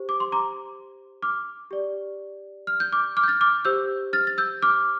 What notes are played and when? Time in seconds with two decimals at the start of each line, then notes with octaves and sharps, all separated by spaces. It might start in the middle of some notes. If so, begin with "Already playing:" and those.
Already playing: G4 C5
0.09 D6
0.20 C6
0.32 A#5 D6
1.23 D6 F6
1.71 G4 D5
2.67 F6
2.80 G6
2.92 D6 F6
3.17 D6 F6
3.23 G6
3.28 F6 A6
3.41 D6 F6
3.65 G4 C5 E6 G6
4.13 F6 A6
4.27 A6
4.38 E6 G6
4.62 D6 F6